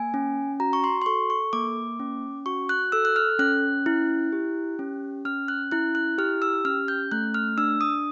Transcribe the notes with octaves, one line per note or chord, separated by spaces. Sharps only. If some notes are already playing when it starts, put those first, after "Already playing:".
Already playing: A#3 G#5
C#4
F#4 A#5
C#6
C6
C6
A4 C#6
C#6
A#3 D6
C#4
F#4 C#6
F#6
A4 E6
F#6
F6
C#4 F#6
E4
G4
C#4
C#4 F6
F#6
E4 F#6
F#6
G4 F6
E6
C#4 F6
G6
A3 F#6
F6
D4 E6
D#6